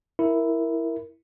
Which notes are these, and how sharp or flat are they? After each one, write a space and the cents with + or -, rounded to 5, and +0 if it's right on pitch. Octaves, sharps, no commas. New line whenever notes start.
E4 +0 A#4 +0